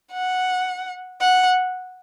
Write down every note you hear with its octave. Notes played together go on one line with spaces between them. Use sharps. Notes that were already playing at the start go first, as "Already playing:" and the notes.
F#5
F#5